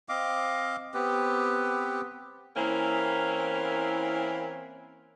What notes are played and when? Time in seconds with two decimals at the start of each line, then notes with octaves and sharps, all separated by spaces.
0.09 C4 D#5 F5 D6
0.94 B3 C4 G4 B4
2.57 E3 A#3 C4 C#4 E4 A#4